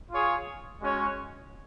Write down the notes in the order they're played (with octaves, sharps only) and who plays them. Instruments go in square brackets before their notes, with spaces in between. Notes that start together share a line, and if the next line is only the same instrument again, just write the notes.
[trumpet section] F4 G#4 C#5
G#3 C#4 F#4 C#5